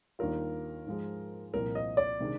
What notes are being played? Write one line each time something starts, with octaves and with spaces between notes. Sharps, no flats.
D#2 D#3 G3 D4 F4 A#4
G#2 F3 G#3
C2 A#2 F3 C4 A#4
D#5
D5
C3 D#3 G#3 D4